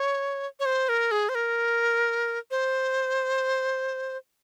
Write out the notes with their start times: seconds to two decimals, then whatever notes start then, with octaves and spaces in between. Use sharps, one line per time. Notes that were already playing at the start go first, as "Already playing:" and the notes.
Already playing: C#5
0.60 C#5
0.65 C5
0.89 A#4
1.11 G#4
1.29 C5
1.35 A#4
2.51 C5